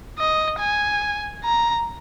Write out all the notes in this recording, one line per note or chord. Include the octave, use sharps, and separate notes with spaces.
D#5
G#5
A#5